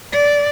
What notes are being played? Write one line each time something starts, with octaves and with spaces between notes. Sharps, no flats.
D5